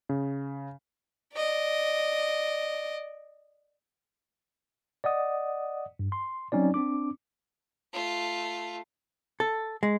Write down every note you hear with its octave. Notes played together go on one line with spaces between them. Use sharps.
C#3
D5 D#5
D5 D#5 F#5 D#6
G2
C6
F#3 C4 C#4 D#4 D5
C4 D4 D6
A3 F4
A4
G#3